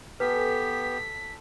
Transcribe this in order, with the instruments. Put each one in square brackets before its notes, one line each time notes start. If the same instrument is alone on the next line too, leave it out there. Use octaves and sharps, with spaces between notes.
[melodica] B3 G4 [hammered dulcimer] A4 G#5 [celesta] B4 [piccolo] B6